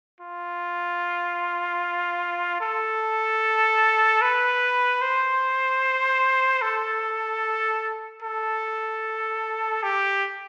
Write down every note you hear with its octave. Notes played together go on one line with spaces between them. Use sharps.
F4
A4
B4
C5
A4
A4
G4